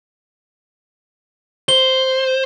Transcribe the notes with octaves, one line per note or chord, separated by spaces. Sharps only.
C5 G7